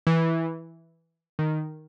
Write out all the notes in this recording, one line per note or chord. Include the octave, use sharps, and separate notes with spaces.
E3
D#3